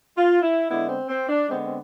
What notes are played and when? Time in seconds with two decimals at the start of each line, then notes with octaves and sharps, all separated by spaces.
0.16 F4
0.42 E4
0.69 D3 G#3 B3 E4
0.89 C4
1.09 C4
1.28 D4
1.49 D3 G#3 B3 C4
1.65 C4